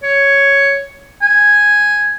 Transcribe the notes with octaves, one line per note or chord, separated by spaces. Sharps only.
C#5
G#5